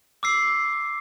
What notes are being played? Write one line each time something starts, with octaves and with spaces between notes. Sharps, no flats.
D6 E6 C7